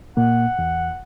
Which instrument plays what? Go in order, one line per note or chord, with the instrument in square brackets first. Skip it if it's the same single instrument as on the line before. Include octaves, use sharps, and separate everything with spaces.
[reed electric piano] A#2 A#3 [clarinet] F#5
[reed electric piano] E2